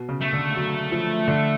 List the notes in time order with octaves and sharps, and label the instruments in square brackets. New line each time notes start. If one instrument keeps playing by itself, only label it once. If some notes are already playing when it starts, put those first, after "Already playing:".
Already playing: [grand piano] B2
C#3
[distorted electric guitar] A3
[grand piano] D3
F#3
F3
D3